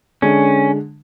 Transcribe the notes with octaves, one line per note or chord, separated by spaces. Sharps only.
D3 G#3 C#4 D4